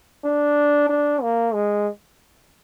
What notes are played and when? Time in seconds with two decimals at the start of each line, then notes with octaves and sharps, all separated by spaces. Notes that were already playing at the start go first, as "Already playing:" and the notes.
0.24 D4
0.89 D4
1.22 A#3
1.54 G#3